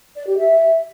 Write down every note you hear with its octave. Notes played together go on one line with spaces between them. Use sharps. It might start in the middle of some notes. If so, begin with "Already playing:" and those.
D5
G4
E5